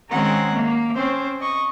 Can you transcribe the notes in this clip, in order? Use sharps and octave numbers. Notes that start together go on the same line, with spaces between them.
D#3 G#3 C4 C#4 F#5 A#5
A#3
C4 C#4 C5
D#5 C#6